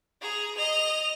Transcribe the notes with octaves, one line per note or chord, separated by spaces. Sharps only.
G#4 A#5
D#5 F7